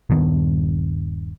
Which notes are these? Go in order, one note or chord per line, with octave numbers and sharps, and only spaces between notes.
D#1 G2 D#3 B3